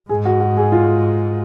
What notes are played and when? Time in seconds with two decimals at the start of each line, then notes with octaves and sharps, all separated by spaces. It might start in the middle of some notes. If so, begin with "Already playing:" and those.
0.09 G#2 G#4
0.25 F#4
0.41 F#4
0.57 G#4
0.72 F4